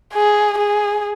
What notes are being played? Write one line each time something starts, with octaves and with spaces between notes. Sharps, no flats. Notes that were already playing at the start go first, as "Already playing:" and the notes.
G#4
G#4